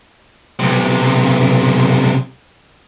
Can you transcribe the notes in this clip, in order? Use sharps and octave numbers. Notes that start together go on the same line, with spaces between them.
B1 C3